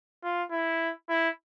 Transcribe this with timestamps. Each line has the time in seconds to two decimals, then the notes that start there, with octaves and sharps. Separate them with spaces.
0.23 F4
0.52 E4
1.09 E4